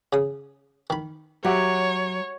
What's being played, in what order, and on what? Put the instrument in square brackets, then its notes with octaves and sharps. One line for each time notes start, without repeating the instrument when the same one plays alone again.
[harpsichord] C#3 D#6
D#3 B5
[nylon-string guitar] F#3 [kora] F#4 G4 E5 [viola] C#5